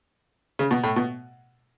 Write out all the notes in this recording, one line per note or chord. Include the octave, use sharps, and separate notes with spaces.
C#3
B2
A2
B2